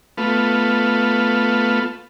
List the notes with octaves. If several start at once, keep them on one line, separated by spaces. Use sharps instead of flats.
A3 B3 F4